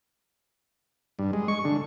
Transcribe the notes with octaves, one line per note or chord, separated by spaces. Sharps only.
G2
G#3
C#6
D3